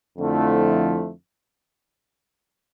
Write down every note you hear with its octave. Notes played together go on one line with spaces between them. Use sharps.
F2 D3 F3 A3 E4